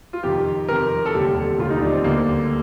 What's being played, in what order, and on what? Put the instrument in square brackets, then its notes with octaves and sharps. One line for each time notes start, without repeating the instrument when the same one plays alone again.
[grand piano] F4
F2 C3 D#3 G4
F2 C3 D#3 A#4
A4
F1 D#2 D3 G3 G4
F1 D#2 D3 G3 F4
D#4
D4
C4
D2 D3 G3 A#3